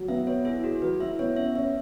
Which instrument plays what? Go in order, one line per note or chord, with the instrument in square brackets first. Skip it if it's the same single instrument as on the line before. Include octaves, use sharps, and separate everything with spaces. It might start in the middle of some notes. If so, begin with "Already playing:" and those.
Already playing: [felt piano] F#3
[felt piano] B3 [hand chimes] E5
[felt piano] B4 [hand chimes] C#5
[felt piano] E4 [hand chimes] G#4
[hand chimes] F#4 [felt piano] G#4
[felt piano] F#3 [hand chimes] B4
[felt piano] E4 [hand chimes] E5
[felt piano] B3 [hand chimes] C#5
[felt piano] C#4 [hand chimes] E5
[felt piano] C#4 [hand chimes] E5